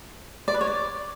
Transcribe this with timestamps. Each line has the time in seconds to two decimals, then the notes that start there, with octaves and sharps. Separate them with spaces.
0.48 D5
0.54 B4
0.61 C#5
0.67 D5